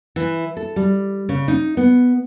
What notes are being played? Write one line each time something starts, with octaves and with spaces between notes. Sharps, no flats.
E3
A4
G3
C#3
D#4
B3